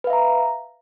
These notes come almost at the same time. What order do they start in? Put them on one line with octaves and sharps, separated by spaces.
B4 F5 E5 A#5